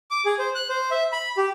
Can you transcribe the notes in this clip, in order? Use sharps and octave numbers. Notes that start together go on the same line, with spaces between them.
D6
G#4
C5
F#6
C5
E5
B5
G4